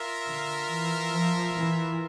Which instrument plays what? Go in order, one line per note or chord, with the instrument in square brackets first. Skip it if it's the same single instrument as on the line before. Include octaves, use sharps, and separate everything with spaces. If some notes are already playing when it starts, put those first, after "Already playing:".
Already playing: [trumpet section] F4 A#4 E5
[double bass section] D3
E3
F3
E3